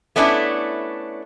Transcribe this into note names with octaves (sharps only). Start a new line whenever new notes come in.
A3 B3 C#4 D4 E4